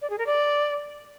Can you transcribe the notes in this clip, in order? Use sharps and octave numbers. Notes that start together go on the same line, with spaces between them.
D5
G#4
A#4
D5